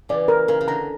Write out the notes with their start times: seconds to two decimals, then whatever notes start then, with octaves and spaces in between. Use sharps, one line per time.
0.09 C#3 E3 D5
0.28 A#4
0.48 C#3 A#4
0.61 C#3
0.68 D3 A#5